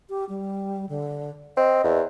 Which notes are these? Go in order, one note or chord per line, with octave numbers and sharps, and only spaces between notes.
G4
G3
D3
C4 D#5
E2